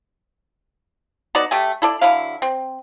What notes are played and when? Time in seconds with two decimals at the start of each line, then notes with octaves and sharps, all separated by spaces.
1.35 B3 D#4 F#4 D5
1.51 A3 G4 E5 G#5
1.82 E4 A4 D5
2.01 D3 F#3 E4 F5
2.42 C4